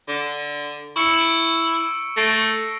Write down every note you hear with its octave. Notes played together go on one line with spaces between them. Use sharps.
D3
E4 C#6 E6 C#7
D7
A3 A#6 C7 D7